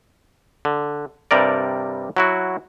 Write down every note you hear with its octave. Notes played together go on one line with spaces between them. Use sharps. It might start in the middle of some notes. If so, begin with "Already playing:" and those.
D3
G2 C3 G3 A#4 D5
F#3 E4 F#4